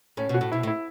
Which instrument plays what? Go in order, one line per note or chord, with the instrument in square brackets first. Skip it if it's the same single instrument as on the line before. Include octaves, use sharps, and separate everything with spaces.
[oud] A2 [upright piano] C#4
[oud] B2
[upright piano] F#4
[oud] A2
[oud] B2 [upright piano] E4
[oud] A2
[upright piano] E4